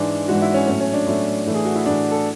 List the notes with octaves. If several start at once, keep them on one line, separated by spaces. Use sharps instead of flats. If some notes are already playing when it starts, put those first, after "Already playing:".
Already playing: G#2 E3 G#3 D4
G#2 E3 G#3 F#4
E4
C#4
A2 F#3 A3 C#4
C#4
D4
A2 F#3 A3
A2 E3 A3
G#4
F#4
E4
A2 E3 A3 D4
A4